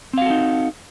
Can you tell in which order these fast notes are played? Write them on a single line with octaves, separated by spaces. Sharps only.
C4 F5 F#4 A4 D#4